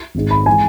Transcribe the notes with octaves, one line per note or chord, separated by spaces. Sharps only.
G#1 G#2 G#3
B5
E3 G#3 G#5